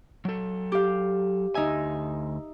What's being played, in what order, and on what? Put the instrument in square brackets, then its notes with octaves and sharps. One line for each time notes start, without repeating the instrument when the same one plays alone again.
[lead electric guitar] F#3 A4
[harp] G4 F5
[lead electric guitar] D2 G#5 [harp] D#4 E5